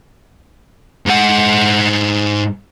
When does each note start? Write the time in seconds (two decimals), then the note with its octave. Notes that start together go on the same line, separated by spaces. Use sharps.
1.06 G#2 F#5